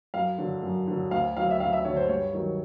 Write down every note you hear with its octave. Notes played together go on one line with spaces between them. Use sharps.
F#2 F5
D3 F#3
F#2
D3 F#3
D2 F5
D3 F#3 F5
E5
D2 F5
E5
D3 F#3 C#5
C5
G2 C#5
D#3 F#3